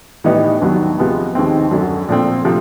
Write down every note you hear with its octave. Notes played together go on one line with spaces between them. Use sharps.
A2 E3 G3 B3 D#4
D#2 D#3 F#3 B3
C3 F3 G#3 B3
D#2 D#3 G#3 C4
F#2 D3 F#3
A#2 F3 A3 C4
C3 F3 A3